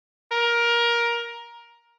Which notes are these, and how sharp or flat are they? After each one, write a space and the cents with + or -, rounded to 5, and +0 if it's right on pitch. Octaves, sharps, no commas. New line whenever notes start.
A#4 +15